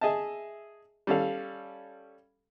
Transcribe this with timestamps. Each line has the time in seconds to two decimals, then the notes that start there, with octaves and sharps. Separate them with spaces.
0.01 G#4 D#5 E5 A5
1.07 G3 C#4 A4 F5